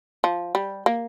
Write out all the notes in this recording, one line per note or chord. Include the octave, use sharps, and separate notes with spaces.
F3
G3
A#3